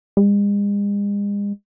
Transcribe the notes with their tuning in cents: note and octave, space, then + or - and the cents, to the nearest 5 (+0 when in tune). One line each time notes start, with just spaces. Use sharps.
G#3 -40